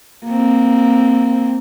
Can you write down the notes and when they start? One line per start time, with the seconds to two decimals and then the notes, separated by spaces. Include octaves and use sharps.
0.25 A#3 C4